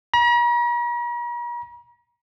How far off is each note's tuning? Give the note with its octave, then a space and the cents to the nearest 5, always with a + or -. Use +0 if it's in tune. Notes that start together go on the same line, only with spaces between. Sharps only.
A#5 +45